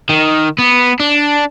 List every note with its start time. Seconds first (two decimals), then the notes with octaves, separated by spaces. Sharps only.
0.09 D#3
0.58 B3
1.00 D4